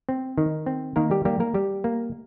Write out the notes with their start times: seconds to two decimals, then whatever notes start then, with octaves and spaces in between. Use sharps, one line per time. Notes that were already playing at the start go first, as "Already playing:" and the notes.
0.09 C4
0.38 D#3
0.66 C4
0.96 D#3 A#3 A#4
1.11 G3 G4
1.25 G3 A#3 G4
1.40 A#3 A#4
1.54 G3 G4
1.84 A#3